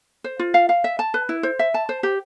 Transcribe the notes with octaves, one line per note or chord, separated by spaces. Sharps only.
C5
F4
F5
F5
E5
A5
B4
E4
C5
E5
A5
C5
G4